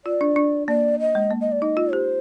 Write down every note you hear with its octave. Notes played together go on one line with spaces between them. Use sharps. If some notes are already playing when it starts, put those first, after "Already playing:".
F4 D5
D4
D4
A#3 D5
D#5
G#3
A#3
D#5
D5
D#4 D#5
F4
G4 C5